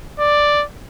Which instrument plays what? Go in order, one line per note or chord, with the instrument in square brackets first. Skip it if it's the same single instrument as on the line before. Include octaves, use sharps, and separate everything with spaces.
[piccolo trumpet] D5